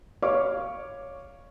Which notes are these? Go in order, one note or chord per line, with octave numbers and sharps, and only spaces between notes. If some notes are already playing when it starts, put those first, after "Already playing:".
C#5 F5 C#6 D6